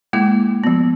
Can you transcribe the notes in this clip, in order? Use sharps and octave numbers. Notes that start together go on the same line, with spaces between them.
G#3 A#3 E4 D6
F3 B3